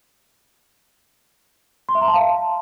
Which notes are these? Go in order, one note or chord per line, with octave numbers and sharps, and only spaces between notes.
C6
E5
A#5
A5
F5